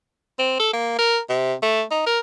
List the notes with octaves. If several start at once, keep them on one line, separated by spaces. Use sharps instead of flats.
C4
A4
A#3
A#4
C3
A3
D#4
A#4